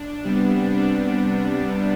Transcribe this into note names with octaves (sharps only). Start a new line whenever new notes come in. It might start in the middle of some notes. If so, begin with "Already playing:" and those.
Already playing: D4
C3 G3 B3
D4